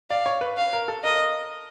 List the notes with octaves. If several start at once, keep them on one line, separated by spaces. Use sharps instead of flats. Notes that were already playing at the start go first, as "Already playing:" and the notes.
D5 F5
C#5
B4
F5
A#4
A4
A#4 D#5